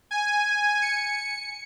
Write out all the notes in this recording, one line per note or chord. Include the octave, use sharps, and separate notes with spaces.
G#5
C#7